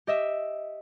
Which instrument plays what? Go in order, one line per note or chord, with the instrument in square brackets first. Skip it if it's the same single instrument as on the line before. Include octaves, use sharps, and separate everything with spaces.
[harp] G4 D#5 E5